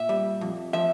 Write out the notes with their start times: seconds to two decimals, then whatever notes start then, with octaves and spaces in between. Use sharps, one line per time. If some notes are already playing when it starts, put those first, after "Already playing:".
Already playing: A#2 E5
0.09 G3
0.41 F2
0.73 F3 E5